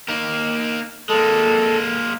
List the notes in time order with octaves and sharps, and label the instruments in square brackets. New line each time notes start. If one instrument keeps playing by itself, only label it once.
[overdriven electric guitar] A#3 D#4
[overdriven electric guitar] G#3 A#3 [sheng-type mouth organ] A4